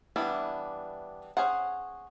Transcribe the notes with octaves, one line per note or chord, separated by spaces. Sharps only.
E3 G3 B3 D4 E4
C#4 G#4 C5 F#5